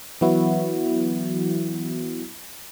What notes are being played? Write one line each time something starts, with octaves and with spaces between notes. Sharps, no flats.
E3 F#3 B3 E4 F#4